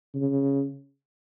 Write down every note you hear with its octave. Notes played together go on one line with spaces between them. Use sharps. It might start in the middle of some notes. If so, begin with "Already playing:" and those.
C#3